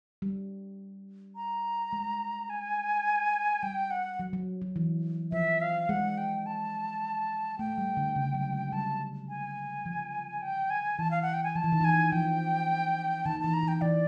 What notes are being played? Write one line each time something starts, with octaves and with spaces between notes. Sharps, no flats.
G3
A#5
G#3
G#5
G3 G5
F#5
F#3
F#3
F#3
E3
F3 E5
F5
G#3 F#5
G5
A5
A3 G5
G3
D3
C#3
F#3
G#3
G3 A5
G#5
F3
G5
G#5
E3 A5
F5
F#5
G5
G#5
F3 A5
E3
D#3
E3 G#5
F3 G5
D#3 A5
E3 A5
A#5
E3
G5
E3 D5